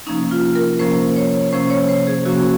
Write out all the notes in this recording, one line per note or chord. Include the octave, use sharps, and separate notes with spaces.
C3 F3 A#3 C#4 D#4
F4
A#4
C3 F3 A#3 C#4 C5
C#5
C3 F3 A#3 C#4 C5
C#5
C5
G#4
C3 F3 A#3 C#4 F#4